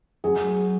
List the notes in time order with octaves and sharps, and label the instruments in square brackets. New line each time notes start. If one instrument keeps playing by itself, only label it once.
[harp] F#3 [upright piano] G#4